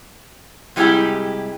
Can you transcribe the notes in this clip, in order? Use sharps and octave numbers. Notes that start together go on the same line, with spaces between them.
C3 G3 G#3 D#4 E4 G4